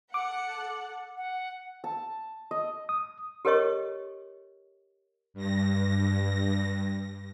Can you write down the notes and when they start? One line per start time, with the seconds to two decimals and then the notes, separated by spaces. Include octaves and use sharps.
0.14 A4 F#5 D6
1.17 F#5
1.84 A5
2.51 D#5
2.89 D#6
3.45 G4 A4 A#4 C#5 D#5 C#6
5.34 G2 A#6